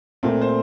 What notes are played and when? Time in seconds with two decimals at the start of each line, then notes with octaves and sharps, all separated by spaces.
0.23 A#2 A3 C4
0.41 C5